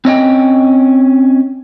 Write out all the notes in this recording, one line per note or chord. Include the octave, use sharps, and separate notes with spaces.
C4 C#4 D#5 G5